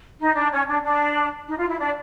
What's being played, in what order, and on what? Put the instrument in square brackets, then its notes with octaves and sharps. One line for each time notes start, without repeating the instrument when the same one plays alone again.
[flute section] D#4
D4
C#4
D4
D4
D#4
F4
E4
D4